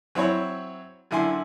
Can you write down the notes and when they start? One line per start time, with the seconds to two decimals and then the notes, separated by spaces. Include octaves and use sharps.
0.15 F#3 C4 E4 C#5 B5
1.11 F#2 D3 E4 G#5 C6